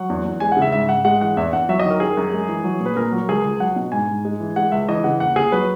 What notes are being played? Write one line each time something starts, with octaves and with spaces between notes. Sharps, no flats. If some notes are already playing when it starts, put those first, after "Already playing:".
Already playing: F#3 F#5
E2
E2
G#3 G#5
C#3 F#5
E5
G#2 E5
G#2 F#5
G#3 F#5
E3 F#5
E2 E5
E2 F#5
F#3 E5
D#5
D#3
A#4
F#2 G#4
F#2
G#3
E3
F#3
A#2
B4
A#2 A#4
F#3
C#2 G#4
C#2
F#3 F#5
B2
G#2 G#5
G#2
G#3
E3
G#3 F#5
C#2 E5
E3 D#5
C#3 F#5
D#2 F#5
D#2 G#4
F#3 B4